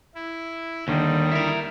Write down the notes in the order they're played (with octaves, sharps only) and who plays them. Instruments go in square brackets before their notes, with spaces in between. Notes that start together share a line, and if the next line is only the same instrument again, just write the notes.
[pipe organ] E4
[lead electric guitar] D#2 D3 [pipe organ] D#3 G3
[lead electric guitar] E4 A#4